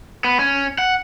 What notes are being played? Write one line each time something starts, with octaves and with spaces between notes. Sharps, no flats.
B3
C#4
F#5